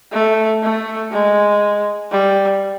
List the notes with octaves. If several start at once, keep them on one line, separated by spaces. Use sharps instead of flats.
A3
A3
G#3
G3